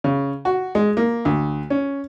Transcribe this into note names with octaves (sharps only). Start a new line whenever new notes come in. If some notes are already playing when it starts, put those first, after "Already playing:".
C#3
F#4
G#3
A#3
D2
C#4